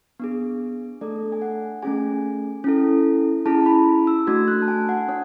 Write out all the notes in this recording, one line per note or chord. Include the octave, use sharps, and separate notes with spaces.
B3 D4 G#4
A3 D4 A4 D5
G#5
F#5
A3 C#4 G#4 G#5
C#4 E4 A4
C#4 E4 G#4 A5
B5
E6
A3 D4 F#4 G#6
F#6
A5
G#5
F#5
D4 C#5